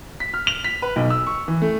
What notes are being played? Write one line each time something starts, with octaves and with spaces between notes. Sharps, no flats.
B6
F6
F7
B6
B4
B1
E6
C#6
E3
A3